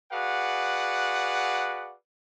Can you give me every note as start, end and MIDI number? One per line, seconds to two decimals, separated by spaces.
0.12 1.93 66
0.12 1.93 68
0.12 1.93 71
0.12 1.93 74
0.12 1.93 77
0.12 1.93 78